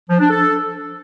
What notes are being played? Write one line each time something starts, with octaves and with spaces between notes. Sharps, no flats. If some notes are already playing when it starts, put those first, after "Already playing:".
F3
D4
A4